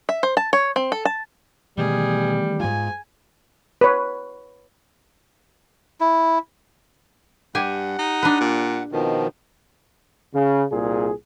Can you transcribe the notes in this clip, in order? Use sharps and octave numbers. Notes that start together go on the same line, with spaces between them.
E5
C5
A5
C#5
C4
A4
A5
B2 D#3 E3 G3 A3 G#4
G#2 F4 G#5
B4 C#5
E4
G2 G4 F#5 G#5
D#4
D4 B4
A#2
F2 B2 D#3 F3
C#3
C2 A#2 G#4